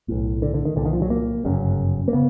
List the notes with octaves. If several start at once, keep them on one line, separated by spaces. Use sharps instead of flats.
B1 A2
D3
D3
D#3
C2 A#2 D3
D#3
F3
F#3
A#3
G1 F#2 C#3
A#3
C#3 B3